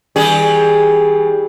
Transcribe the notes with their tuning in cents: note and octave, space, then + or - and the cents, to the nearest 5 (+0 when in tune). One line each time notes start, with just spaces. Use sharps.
E3 -45 G3 +5 G#4 +0